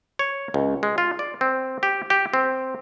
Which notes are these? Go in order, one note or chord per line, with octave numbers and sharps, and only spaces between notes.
C#5
C#2
G#3
F4
D5
C4
G4
G4
C4